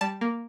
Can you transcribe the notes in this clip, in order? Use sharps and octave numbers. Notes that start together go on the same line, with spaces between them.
G3 A5
A#3